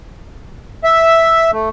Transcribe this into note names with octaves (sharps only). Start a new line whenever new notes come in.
E5
A3